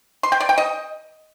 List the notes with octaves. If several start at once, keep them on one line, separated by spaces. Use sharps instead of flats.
C6
G5
D5
G5
D#5